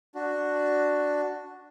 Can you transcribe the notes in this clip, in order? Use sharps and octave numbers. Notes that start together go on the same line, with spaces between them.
D4 F#4